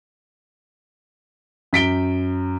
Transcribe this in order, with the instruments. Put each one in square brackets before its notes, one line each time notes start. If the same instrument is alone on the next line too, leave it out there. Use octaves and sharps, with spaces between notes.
[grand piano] F#2 B6 D7 G7